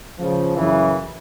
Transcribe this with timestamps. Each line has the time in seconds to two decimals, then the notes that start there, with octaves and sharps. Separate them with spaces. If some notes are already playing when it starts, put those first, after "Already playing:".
0.17 C#2 C#3 F3
0.56 F#2 C#3 E3